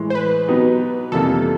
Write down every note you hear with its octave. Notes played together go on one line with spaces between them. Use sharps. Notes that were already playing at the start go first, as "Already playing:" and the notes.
Already playing: A2 E3 G#3
C5
B4
B2 F#3 B3 D#4 G4
F2 C3 E3 G3 A#3 A4